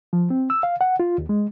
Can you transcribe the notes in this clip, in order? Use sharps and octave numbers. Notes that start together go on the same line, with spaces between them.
F3
C4
E6
F5
F#5
F4
D#2
G#3